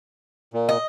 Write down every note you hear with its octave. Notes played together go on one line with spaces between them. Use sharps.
A#2
D#5